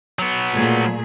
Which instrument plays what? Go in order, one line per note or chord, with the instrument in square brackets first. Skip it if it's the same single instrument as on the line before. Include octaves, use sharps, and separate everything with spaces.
[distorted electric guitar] F#3 B3
[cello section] A#2 A3 G#4